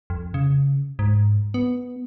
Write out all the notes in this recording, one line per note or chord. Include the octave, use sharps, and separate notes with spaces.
F2
C#3
G#2
B3